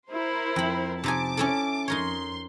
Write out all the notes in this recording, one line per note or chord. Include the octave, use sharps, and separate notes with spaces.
E4 A#4 C5
F2 B5
C3 D#4 G#5 A5 D6
C#4 E4 A4
F2 D#4 A#4 C#5 C6